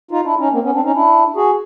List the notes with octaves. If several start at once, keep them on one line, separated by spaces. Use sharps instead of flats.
D#4 F4
D4 E4
C#4 D#4
A#3 C4
B3 C#4
C4 D4
C#4 D#4
D4 E4
F#4 G#4